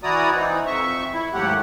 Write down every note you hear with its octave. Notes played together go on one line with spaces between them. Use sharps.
E3 E4 F#4 D5 A#5 D#6
E3 C4 D#4
F2 E5 C#6
E4
D#2 G#2 F#3 A3 G4 F#5